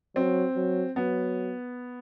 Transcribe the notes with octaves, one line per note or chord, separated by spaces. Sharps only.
F#3 C4
F#3
F#3 B3